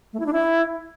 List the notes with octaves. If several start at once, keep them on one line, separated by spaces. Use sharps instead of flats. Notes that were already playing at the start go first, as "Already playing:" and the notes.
A3
E4
D4
E4